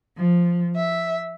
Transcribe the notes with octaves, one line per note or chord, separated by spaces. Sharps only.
F3
E5